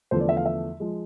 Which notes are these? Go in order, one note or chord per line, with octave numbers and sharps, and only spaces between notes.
E2 D3 F3 A3 C5
D5
E5
F5
E5
F3 G#3